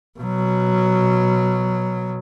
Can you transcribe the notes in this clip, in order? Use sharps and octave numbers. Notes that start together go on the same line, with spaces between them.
B2 F#3